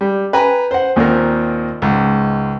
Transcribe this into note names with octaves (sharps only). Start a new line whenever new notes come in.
G3
B4 G5 G#5 A#5
C5 F#5
D#2 A#2 C4 A#4
C#2 G#2